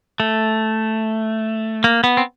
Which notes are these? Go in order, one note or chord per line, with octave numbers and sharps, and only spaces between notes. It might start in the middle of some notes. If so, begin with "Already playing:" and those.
A3
A#3
B3
C4